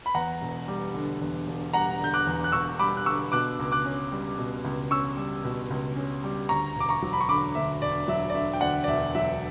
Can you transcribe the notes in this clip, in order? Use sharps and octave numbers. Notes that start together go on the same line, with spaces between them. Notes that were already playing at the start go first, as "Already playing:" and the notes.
B5
E2 F#5 A#5
E1
G3
D3
E2
E1
G3 F#5 A#5
D3 G6
D6 F#6
E2
F#6
E1 C#6 E6
G3 B5 D6
F#6
D3 C#6 E6
B2 D6 F#6
C#2
D6 F#6
C#4
G3
B2
C#2
C#4 C#6 E6
G3
B2
C#2
C#4
G3
D2 A#5 C#6
E1 D6
A#5 C#6
F#3
B5
C#6
D3 B5 D6
D2 E5
E1 D5
F#3 E5
D5
D3 E5
G5
D2 D5 F#5
D5
E1 E5
F#3 E5